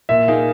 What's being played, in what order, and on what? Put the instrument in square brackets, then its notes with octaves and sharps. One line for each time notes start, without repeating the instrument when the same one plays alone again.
[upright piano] A#2 [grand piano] E5
[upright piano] A#3 D#4 G#4